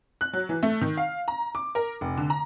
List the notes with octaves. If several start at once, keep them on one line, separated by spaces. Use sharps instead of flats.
F#6
F#3
E3
A3
D#3
F5
A#5
D6
A#4
F1
D3
A#5